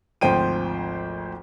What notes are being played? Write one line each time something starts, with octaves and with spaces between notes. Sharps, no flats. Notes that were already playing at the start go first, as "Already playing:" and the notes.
G#1 D2 F3 C5 G5 D#7